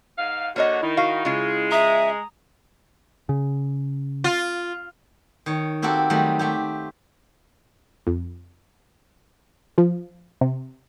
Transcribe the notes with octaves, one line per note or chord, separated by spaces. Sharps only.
G#2 F5
D3 A#3 F#4 C#5 D#5
D#3 E4
F#4 F5
C#3 G#3 F4
E5 A#5 D#6
C#3
F4
D#3 C#5
A#3 C4 F#4 G4 A4
D#3 F#3 G3 A3 C4
A3 C4 G4
F2
F3
C3